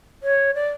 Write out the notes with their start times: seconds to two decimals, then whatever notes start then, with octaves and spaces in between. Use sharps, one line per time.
0.23 C#5
0.55 D5